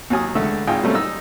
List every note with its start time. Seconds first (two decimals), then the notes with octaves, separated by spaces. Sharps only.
0.10 D#2 F#3 G#5 D#6
0.35 C#2 D3 A3 A4 E5
0.67 G#1 D#4 F4 G5 G#5
0.83 F#3 G3 A3 A#3 C4 C#4
0.95 D#4 E6